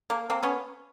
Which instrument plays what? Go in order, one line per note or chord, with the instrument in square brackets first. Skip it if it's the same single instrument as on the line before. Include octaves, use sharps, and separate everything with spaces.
[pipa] A#3
A#3 C4
B3 C#4